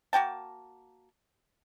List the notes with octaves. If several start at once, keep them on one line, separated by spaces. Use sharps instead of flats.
A#3 F#4 G5 A5